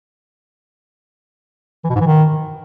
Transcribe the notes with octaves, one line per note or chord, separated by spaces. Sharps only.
E3
B2
G#2
E3
D#3